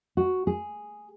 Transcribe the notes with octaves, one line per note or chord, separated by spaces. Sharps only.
F#4
G#4